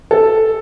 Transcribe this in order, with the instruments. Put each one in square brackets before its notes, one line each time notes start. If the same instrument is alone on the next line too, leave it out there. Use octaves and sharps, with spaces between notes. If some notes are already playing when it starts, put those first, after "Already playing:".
[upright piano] A4